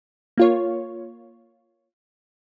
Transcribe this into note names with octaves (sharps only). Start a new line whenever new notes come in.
A#3 F4 C#5